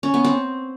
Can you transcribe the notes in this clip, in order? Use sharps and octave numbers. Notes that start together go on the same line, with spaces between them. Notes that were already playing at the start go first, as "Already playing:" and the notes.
C#4
B3
C4